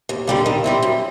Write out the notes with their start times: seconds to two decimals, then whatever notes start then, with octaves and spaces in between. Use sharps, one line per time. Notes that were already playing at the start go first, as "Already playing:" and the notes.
0.09 D#2
0.27 D3 G3 A#3
0.46 D#3
0.64 G3 C4 E4
0.83 F#2